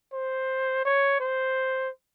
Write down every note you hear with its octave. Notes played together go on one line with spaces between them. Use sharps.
C5
C#5
C5